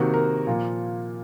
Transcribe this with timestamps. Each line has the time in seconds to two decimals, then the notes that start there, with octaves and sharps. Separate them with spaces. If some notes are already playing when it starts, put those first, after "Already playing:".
Already playing: C3 D#3 A#3 F#4
0.14 A#4
0.47 A#2 F3 A#3 F4